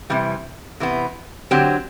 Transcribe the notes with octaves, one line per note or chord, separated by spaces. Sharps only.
C3 E3 G3
C3 E3 B3
D3 F#3 C4 G4